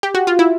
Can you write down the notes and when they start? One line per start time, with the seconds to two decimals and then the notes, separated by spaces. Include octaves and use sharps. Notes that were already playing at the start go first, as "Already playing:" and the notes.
0.03 G4
0.15 F#4
0.27 F4
0.39 E4